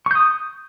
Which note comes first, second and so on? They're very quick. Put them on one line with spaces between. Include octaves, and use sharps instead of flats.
C#6 G6 D#6